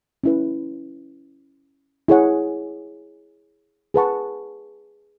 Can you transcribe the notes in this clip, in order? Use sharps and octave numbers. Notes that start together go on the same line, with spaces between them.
C#4 E4 B4
E4 G#4 C#5 F#5
G#4 B4 F#5 A5 C#6